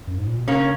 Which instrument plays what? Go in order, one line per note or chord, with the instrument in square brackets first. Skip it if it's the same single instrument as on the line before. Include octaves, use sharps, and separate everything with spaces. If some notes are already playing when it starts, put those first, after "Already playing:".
[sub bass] F#2
G#2
A#2
B2
[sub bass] C#3 [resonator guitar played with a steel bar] A#3 C#4